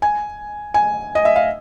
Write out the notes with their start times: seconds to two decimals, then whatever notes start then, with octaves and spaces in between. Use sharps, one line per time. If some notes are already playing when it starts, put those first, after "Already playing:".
0.02 G#5
0.74 G#5
1.15 D#5
1.25 E5
1.36 F5